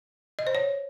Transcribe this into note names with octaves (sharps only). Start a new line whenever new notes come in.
D#5
C5
C#5